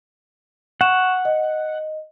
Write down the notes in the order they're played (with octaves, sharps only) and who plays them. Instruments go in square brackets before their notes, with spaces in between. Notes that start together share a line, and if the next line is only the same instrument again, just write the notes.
[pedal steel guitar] F#5 [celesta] C#6 E7
[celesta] D#5